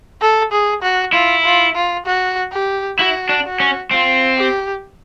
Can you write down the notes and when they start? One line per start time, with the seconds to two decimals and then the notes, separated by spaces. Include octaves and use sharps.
0.21 A4
0.52 G#4
0.82 F#4
1.13 E4 F4
1.44 F4
1.75 F4
2.06 F#4
2.53 G4
2.98 E4 F#4
3.29 D4
3.45 F#4
3.60 C#4
3.91 C4 F4
4.38 G4